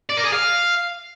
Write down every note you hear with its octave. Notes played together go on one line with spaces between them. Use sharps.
D5
A#4
G#4
F5